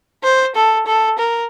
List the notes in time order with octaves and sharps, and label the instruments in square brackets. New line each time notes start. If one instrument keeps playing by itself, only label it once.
[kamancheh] C5
A4
A4
A#4